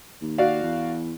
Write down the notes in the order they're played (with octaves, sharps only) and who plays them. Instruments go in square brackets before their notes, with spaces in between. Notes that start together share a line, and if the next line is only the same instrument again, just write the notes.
[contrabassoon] D#2
[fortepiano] F#4 D5 F5
[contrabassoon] E2